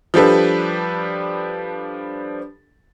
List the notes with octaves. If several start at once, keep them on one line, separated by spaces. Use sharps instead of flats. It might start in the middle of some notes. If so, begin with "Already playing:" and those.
F3 G3 D4 G4 A4 B4